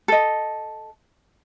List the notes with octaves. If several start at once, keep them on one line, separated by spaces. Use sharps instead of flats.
A4 D#5